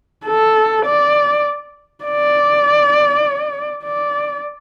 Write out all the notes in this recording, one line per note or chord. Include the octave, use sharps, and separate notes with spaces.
A4
D5
D5
D5